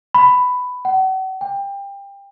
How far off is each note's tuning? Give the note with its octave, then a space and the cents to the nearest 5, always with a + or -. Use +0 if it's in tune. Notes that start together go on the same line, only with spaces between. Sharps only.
B5 +10
F#5 +40
G5 +25